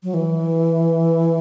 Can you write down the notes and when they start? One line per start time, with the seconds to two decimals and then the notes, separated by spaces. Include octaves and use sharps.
0.03 F#3
0.14 E3